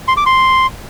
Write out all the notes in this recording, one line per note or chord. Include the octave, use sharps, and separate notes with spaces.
C6
D6
C6